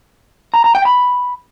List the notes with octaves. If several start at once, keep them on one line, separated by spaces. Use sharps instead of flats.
A#5
A#5
G5
B5